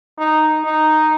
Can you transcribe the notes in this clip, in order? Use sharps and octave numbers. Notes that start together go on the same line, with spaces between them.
D#4
D#4